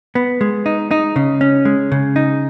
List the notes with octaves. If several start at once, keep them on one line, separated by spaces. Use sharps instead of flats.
B3
G#3
D#4
D#4
C#3
C#4
G#3
C#3
D#4